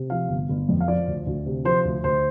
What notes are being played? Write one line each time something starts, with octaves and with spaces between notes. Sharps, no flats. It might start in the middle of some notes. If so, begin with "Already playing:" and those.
Already playing: C3
F3 F5
G1
G1
F2
F5
F3 D5
D2
D2
C3
F3 C5
D2
D2 C5